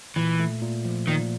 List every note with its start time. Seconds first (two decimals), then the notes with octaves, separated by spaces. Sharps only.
0.16 A#2 E3
0.40 A3
0.62 A#2
0.85 F3
1.07 A#2 D#3